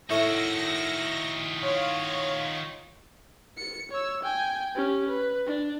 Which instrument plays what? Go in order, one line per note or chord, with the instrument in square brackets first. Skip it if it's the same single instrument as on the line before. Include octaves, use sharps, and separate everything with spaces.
[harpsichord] A2 A3 C#6 [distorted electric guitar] D#3 F#4 [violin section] E6 A#6 C#7
[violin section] F4 C#5
[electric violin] C#7
C#5 E6
G5 G#5
C#4 G4
B4
D4